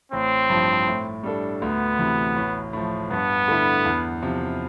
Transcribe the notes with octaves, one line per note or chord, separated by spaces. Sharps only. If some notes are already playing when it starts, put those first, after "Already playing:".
A1 C4
G2 F3
A2
G3 D4 A4
D2 B3
C3 E3
A1
A2 F3
G2 B3
D3 A3 E4
E2
C3 F3